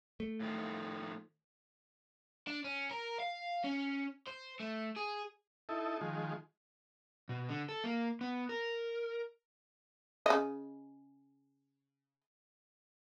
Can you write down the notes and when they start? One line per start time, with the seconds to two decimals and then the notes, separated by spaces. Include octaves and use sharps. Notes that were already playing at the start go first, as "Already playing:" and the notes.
0.20 A3
0.40 A2 D#3 F3
2.47 D4
2.65 C#4
2.91 A#4
3.20 F5
3.64 C#4
4.28 C5
4.60 A3
4.96 G#4
5.69 D#4 E4 A4
6.01 D#3 F3 G#3
7.29 B2
7.49 D3
7.69 A4
7.84 A#3
8.21 B3
8.49 A#4
10.26 C#3 D#5